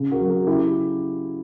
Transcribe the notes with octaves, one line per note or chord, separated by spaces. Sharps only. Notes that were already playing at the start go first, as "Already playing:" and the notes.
Already playing: C#3
F#4 A#4
F#3
F#4 A#4
C#3 E4 G4